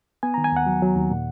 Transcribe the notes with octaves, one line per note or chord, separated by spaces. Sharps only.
B3 G#5
D#3 A#5
G#5
D#2 F#5
F#3
F#3
D#2
A#2